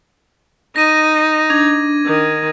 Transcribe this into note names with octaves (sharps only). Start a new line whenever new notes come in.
D#4 A#6 D#7
D4 G#6
D#3